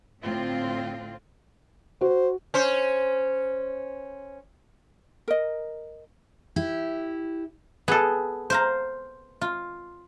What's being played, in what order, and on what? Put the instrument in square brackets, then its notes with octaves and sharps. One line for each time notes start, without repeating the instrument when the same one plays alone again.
[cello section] A2 D3 C4 F4
[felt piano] F#4 [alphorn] C5
[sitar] C#4 C5
[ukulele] A#4 D#5
[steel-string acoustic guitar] E4 G4
[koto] B3 A4 [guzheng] G#4
[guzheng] C5 F5 A#5
F4